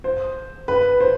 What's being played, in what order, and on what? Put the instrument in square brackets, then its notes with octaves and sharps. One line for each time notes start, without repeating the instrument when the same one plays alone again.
[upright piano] C5
B4
C5